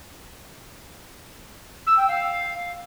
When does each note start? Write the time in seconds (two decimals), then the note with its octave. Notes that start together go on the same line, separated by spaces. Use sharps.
1.86 E6
1.97 G5
2.08 F5